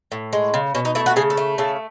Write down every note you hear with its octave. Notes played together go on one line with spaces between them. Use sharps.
A2
G#3
C#3
B2 C#4
D#4
A3 E4
F#4
C#3 G#4
A4
A3
C#3 A4